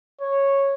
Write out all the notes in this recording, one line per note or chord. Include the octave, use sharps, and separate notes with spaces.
C#5